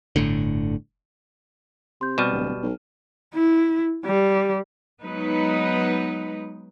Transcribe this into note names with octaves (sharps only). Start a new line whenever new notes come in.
G1 A2 D3
C3 C6 G6
B2 G3 F6 D#7 E7
D1
B1
E4
G3
F#3 G#3 B3 D#4 B4